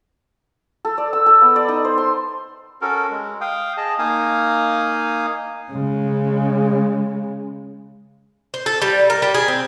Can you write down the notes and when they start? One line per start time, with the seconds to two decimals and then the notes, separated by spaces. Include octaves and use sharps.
0.85 A4
0.98 D5
1.13 E6
1.26 A4
1.42 B3
1.56 D5
1.68 D#4
1.84 C5
1.98 C6
2.82 C#4 F#4 A4 A#4
3.11 G#3
3.41 F5 G5 D#6
3.77 G#4 D#5 A5
3.99 A#3 D#4 F5 G#5 D#6
5.72 C#3 G#3
8.54 C5
8.66 A4
8.82 G3
9.10 A#4
9.22 G3
9.34 G#4
9.48 C4